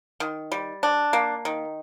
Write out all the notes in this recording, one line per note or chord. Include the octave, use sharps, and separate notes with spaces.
D#3
G3
D4
A#3
D#3